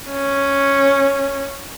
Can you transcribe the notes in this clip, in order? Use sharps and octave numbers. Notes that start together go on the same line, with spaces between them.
C#4